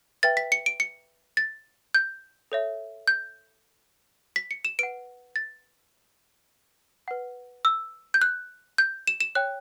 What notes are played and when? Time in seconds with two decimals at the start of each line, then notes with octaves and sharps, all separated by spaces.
0.23 B4 E5 G5 A6
0.37 B6
0.52 C#7
0.66 D7
0.80 C#7
1.37 A6
1.94 G6
2.52 A4 C#5 E5
3.07 G6
4.36 B6
4.51 C#7
4.65 E7
4.79 B4 F#5 D7
5.36 A6
7.08 B4 F#5
7.65 E6
8.14 G6
8.22 F#6
8.78 G6
9.07 E7
9.21 E7
9.35 C#5 G5 F#6